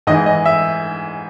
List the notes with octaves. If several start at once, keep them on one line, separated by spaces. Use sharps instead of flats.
G#2 E3 D#5
D#5
E5